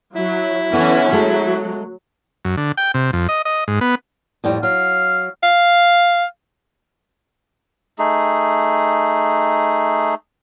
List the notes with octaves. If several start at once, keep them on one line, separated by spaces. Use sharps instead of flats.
F#3 E4
D3 E3 B3 C#4
F#3 G#3 A3
F#2
D3
G5
C3
F2
D#5
D#5
G#2
B3
F2 A2 G3
F#3 F5
F5
A3 D#4 G#4